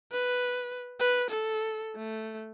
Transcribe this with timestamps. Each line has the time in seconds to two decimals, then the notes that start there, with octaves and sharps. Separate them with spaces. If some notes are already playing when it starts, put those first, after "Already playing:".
0.12 B4
1.00 B4
1.30 A4
1.96 A3